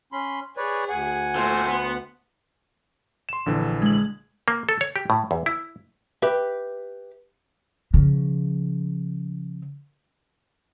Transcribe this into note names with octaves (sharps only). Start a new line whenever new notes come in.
C#4 B5 C6
G#4 B4 C#5 D5
D2 F#5 G#5
A#2 A3 C5
B3
C6 E7
A#1 D3 E3
G#3 F#7
A#3
A4
C#5
G4
A2
E2
E4
G4 B4 E5
C#3 F3